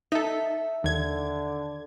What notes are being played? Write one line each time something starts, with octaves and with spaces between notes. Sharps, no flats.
D#4 A4 E5
D#2 D3 G#6